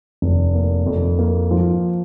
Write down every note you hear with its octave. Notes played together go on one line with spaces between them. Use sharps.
F1
A#3
F2
A#3
F3